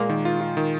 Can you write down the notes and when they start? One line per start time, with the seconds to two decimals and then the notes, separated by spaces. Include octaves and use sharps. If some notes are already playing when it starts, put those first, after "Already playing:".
Already playing: A#2 G#3 A#3
0.09 D#3
0.25 F4
0.41 F4
0.57 D#3